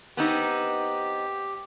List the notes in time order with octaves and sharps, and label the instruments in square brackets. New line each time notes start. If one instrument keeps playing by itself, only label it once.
[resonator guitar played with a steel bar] B3 C4 D#4 [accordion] G4